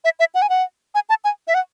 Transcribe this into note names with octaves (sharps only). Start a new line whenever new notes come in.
E5
E5
F#5
G#5
F#5
G#5
A5
G#5
E5
F#5